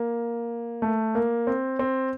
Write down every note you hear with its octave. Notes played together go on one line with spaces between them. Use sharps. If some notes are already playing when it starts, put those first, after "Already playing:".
Already playing: A#3
A3
A#3
C4
C4